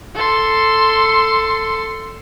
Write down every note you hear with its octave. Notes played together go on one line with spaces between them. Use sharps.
A4 C6